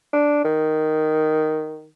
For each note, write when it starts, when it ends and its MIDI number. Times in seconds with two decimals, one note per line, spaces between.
0.13 0.44 62
0.45 1.87 51